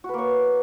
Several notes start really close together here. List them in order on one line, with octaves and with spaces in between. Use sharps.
F#4 B4 A#3 C#5